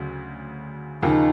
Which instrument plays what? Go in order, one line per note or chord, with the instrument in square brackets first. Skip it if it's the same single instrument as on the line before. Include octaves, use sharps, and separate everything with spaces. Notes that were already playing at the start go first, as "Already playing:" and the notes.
Already playing: [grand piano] D2 C#3 F#3
[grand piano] D#2 C#3 F3 A#3 [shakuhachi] D#4